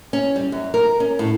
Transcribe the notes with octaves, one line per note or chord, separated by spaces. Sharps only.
C#4
G3
F#2
A#4
C#4
A2